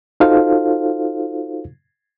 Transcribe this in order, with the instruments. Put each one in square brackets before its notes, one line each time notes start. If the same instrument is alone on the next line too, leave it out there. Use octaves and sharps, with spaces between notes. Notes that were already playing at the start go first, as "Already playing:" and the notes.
[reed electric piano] D#4 F4 F#4 A4 C5 F5